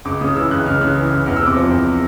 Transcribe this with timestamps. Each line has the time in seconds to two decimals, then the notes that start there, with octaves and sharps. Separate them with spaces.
0.05 C#2 D6
0.21 C#3 D#6
0.35 E3 E6
0.51 C#2 F#6
0.66 C#2 F6
0.81 C#3 F#6
0.96 E3
1.11 C#2
1.26 E2 F6
1.36 E6
1.42 C3 D6
1.56 F3
1.71 E2